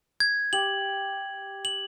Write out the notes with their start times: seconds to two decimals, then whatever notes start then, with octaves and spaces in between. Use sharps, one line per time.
0.20 G#6
0.53 G4 F#7
1.65 F#7